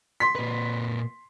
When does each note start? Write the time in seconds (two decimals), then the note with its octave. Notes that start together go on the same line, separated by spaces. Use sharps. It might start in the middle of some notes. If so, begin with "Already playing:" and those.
0.20 C6 B6
0.35 A#2 B4